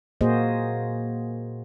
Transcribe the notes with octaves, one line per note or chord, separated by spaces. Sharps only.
A#2 A#3 F#4 G#4 C5 D#5